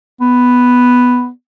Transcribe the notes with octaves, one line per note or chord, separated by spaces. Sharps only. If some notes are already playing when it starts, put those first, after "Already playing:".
B3